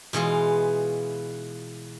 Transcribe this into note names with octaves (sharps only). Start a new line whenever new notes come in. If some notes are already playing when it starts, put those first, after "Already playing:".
B2 E3 G#3 F4